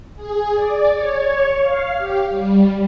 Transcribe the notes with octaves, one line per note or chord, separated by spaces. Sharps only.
G#4
D5
C#5
F5
G4
G3